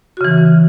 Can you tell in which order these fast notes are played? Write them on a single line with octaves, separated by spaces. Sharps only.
F#4 C#3 E3